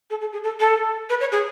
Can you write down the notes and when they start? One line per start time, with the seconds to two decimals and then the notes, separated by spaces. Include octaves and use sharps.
0.10 A4
0.21 A4
0.33 G#4
0.44 A4
0.60 A4
1.10 B4
1.20 C#5
1.32 G#4